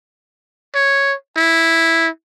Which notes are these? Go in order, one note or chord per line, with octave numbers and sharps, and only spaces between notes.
C#5
E4